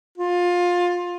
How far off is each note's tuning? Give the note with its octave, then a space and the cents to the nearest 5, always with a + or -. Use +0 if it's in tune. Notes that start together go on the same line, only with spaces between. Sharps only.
F4 +20